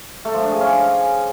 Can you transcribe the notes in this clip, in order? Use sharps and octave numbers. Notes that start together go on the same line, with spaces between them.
A3
F3
D4
G#4
C#4